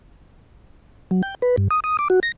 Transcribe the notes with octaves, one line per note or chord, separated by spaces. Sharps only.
F#3
G5
B4
G2
D#6
D#6
D6
F#4
A#6